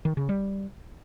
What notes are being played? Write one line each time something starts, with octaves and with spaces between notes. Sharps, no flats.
D#3
C#3
G3